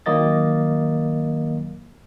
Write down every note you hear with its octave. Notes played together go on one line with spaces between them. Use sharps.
D#3 F#3 A#3 D#5 A6